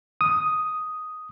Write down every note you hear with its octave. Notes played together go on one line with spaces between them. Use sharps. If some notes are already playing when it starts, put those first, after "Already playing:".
D#6